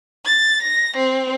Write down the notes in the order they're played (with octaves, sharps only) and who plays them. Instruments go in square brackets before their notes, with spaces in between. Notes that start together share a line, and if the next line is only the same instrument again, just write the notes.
[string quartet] A6
A#6
C4